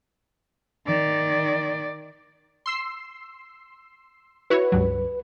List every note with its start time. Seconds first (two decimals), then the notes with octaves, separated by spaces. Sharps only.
0.86 D#3 D5
2.66 C6 E6 C7
4.50 E4 F#4 B4 C#5
4.72 C#2 G2 F#3